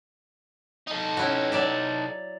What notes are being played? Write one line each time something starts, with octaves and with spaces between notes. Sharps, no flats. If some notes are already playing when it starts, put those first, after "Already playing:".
D#4 A4
C#4 E4 F#4
F#3 D5 E5